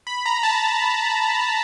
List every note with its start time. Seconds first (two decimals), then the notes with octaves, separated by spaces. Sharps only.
0.07 B5
0.26 A#5
0.43 A5